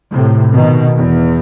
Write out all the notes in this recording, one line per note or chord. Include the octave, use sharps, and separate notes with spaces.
A2 C3
B2 D#3
E2